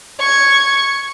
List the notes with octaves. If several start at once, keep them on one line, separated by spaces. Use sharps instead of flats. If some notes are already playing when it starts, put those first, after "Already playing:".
C#6 G#6